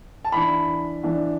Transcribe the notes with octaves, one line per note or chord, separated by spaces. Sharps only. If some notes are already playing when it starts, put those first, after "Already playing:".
A5
E3 D4 B5
E3 D4